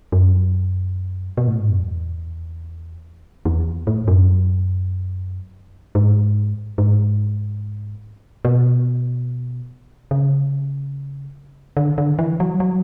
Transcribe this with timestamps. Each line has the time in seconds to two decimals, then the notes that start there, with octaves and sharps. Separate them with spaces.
0.12 F#2
1.37 B2
1.47 A2
1.59 G#2
1.69 F#2
1.79 E2
3.45 E2
3.87 A2
4.08 F#2
5.95 G#2
6.78 G#2
8.45 B2
10.11 C#3
11.77 D3
11.98 D3
12.19 E3
12.40 F#3
12.60 F#3